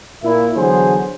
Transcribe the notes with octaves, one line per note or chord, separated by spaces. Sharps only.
A#2 E4
D3 E3 F#3 B3 G#4 C5